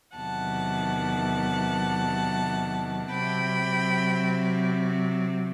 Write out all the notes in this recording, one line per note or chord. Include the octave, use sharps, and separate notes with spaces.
E2 C3 D#3 F#3 F#5 A5
C3 F#3 C4 G5 B5